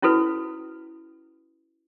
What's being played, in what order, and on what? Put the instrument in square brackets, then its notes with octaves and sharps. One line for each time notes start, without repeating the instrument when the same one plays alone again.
[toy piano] C#4 E4 F#4 A4 B4